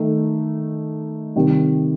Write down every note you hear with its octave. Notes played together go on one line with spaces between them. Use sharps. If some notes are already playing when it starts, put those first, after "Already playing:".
Already playing: D#3 A3 D#4
C3 D#3 G3